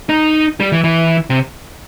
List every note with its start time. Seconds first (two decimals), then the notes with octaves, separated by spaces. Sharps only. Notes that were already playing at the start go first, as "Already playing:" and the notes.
0.09 D#4
0.60 G3
0.72 E3
0.84 E3
1.30 C3